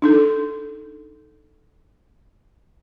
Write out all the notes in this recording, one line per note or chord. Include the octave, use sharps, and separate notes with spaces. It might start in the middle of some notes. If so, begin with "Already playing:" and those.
D4 D#4 A4